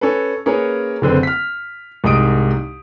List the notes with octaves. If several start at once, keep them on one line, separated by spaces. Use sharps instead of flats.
C#4 A4 B4
A#3 C#4 G#4 A#4 B4 C#5
F#1 D3 C4 B4
F6 B6
C2 G#2 D#4 D#6 D7